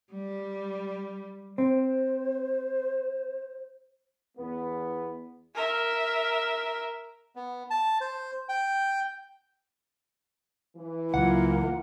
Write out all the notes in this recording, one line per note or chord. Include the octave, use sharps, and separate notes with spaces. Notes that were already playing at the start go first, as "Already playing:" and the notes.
G3
C4 C5
E2 B3
A#4 E5
B3
A5
C5
G5
E3
C#2 F#3 A#3 F4 F#5